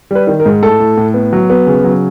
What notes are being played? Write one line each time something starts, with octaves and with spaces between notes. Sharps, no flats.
G3 B4
D#3
A#4
G#2
A2 A4
A2
A2
B3
F#3
B3
C#3
F#3